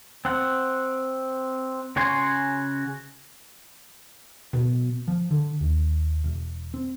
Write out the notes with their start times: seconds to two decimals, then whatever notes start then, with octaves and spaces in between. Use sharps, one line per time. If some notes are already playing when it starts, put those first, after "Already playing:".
0.25 C4 F#5
1.96 C#3 F#4 C#5 G#5 C6
4.53 B2
5.08 F3
5.31 D3
5.61 D#2
6.24 E1
6.74 C4